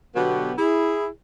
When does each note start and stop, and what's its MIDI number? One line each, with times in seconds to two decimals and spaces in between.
0.15 0.53 47
0.15 0.53 50
0.15 0.53 54
0.15 0.53 59
0.15 0.53 67
0.58 1.07 64
0.58 1.07 68